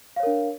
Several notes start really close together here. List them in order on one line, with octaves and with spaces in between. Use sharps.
F5 C#5 A#4 D4